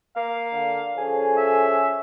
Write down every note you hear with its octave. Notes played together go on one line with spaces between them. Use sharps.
A#3 F5
D3
F3 C#4 G#4 A4
E5